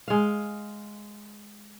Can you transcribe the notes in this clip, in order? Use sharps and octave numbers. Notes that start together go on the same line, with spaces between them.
G#3 F5